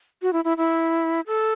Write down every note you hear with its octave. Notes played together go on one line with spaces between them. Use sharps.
F#4
E4
E4
E4
A4